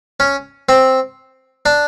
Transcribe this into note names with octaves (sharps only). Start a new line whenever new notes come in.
C#4
C4
D4